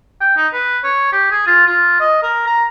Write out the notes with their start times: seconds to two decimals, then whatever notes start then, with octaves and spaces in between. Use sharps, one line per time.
0.21 G5
0.37 D#4
0.53 B4
0.84 C#5
1.12 G4
1.31 G#4
1.46 F4
1.67 F4
2.00 D#5
2.23 A#4
2.47 A#5